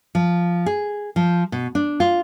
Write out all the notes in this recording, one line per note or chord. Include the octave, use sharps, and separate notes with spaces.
F3
G#4
F3
B2
D4
F4